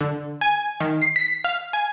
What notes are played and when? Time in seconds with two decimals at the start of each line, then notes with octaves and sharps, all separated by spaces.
0.01 D3
0.41 G#5
0.80 D#3
1.02 C7
1.16 B6
1.44 F5
1.73 G#5